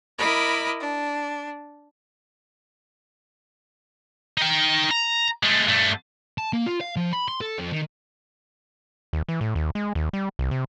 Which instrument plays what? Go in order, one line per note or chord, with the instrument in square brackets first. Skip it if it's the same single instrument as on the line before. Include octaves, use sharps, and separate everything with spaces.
[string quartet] E4 A#4 D#5 B5 D6
D4
[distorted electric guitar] D#4 G5
A#5
G#3 A3
G2 A3
A5
A#3
F4
F5
F3
B5
C6
A4
F2
D#3
[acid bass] D#2
E3
A2
D#2
G#3
D#2
G3
C2
C3